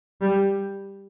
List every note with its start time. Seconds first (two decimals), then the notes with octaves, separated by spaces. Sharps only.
0.21 G3